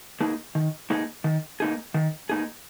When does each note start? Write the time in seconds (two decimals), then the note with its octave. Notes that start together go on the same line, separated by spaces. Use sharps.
0.21 A#3 D#4 G#4
0.55 D#3
0.90 A#3 D#4 G#4
1.24 D#3
1.60 A#3 D#4 G#4
1.94 D#3
2.29 A#3 D#4 G#4